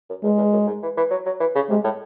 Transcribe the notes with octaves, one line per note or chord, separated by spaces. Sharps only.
F#2
E2 G#3
E2
F#2
G#2
E3
E3
F#3
F#3
E3
C#3
C3 G#3
A2